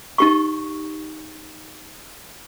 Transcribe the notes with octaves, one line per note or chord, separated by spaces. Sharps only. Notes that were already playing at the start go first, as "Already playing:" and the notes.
D#4 G4 C#6